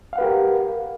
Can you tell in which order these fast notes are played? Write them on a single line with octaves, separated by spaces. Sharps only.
F5 F#5 B4 G4 A#4